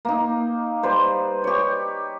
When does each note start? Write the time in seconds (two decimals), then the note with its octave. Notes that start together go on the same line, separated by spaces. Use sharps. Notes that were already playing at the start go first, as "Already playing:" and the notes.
0.05 A#3 D#4
0.83 G3 B4 C5
1.44 G4 C#5